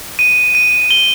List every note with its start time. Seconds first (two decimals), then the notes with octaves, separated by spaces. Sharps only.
0.19 D#7
0.55 D#7
0.91 G7